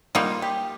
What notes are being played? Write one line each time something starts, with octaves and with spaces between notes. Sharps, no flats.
G3 A#3 D#4 F4
G4